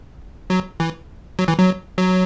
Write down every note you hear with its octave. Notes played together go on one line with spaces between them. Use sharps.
F#3
E3
F#3
E3
F#3
F#3